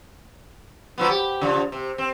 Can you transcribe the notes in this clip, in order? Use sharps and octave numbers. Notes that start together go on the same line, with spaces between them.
F3 F#3 B3
G4
C#3 F3
C3
C4